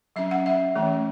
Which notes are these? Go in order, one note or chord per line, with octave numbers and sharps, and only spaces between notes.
F#3 C#4 E5
F#5
E5
E3 A3 C#4